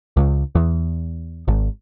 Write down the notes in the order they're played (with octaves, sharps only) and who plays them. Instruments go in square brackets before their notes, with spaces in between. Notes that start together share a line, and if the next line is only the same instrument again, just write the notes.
[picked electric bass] C#2
E2
G#1